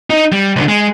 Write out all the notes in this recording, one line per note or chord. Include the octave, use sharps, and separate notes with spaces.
D#4
G3
C#2 D3
G#3